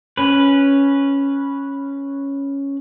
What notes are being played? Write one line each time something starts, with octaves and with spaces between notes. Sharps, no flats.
C#4 B4